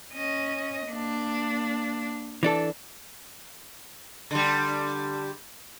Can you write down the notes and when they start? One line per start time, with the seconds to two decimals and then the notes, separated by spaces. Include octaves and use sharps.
0.14 C#4 D#5
0.87 A#3 D4
2.43 E3 D4 A4
4.31 D3 G3